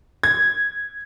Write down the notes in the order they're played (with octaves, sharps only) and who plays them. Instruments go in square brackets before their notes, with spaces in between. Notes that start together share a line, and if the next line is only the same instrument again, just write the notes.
[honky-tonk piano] G#6